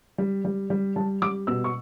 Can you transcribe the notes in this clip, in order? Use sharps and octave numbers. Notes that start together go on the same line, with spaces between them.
G3
G3
G3
G3 A5
G3 D6
B2 E6
C#6